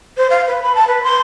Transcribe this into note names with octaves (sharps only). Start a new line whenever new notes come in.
C5
F5
B4
B5
A5
B4
C6